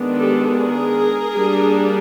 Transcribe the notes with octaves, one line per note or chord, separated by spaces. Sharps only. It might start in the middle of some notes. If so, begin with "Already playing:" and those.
Already playing: D#3 G#3 B3 D4
G4 A4
G#4 A#4
G3 A#3 D4